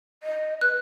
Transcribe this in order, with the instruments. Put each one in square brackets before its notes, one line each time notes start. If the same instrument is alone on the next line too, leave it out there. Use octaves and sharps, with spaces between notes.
[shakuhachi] D#5
[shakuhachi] B4 [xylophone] F#6